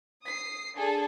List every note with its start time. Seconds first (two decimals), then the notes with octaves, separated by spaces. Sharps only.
0.23 D#6 C7
0.77 D4 G#4 A4 A5